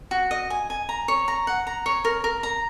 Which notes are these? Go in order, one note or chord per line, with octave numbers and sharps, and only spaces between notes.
F#4
D#5
G#5
G#5
A#5
C#5
A#5
F#5
A#5
C#5
A#4
A#4
A#5